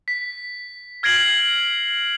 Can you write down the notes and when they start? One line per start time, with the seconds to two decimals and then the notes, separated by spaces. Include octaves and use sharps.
0.08 B6
1.03 F6 G#6 A#6 C7 D7 F#7